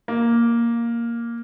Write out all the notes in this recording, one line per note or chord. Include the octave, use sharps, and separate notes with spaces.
A#3